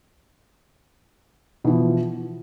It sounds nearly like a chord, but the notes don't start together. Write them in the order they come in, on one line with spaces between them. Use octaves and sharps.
B2 E3 F3